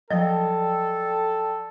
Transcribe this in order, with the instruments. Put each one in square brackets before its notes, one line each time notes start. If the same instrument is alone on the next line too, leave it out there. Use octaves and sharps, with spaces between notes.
[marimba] F3 F#3 [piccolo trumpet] A4 [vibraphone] D5 G5 [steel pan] D#5